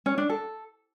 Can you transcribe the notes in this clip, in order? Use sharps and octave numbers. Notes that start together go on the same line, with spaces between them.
C#4
D4
A4